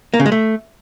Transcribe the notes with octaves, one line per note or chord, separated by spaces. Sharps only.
A#3
C#3
G#3
A3